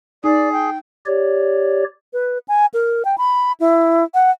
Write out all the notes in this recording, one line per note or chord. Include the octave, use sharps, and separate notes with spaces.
D#4 G#4 D5
G5
G4 C#5 D5
B4
G#5
A#4
G5
B5
E4
F#5